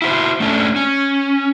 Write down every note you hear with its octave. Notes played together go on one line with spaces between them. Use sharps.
E4 F#4 A#4 C5
A3 C#4 D4 A4
C#4